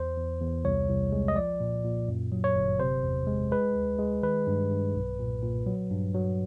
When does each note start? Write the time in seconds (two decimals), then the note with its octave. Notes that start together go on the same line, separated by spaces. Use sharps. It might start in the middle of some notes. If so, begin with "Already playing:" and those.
Already playing: E2 C5
0.17 E2
0.41 E2
0.64 C2 C#5
0.88 C2
1.12 G#3
1.28 D#5
1.36 F3 D5
1.60 A#2
1.84 A#2
2.08 F#2
2.32 F#3
2.44 C#5
2.56 G1
2.80 C3 C5
3.03 E2
3.27 G#3
3.52 G#3 B4
3.75 D2
3.99 G#3
4.22 D#3 B4
4.47 G2
4.71 G2
4.95 B1
5.19 A#2
5.42 A#2
5.66 F#3
5.91 G2
6.15 F#3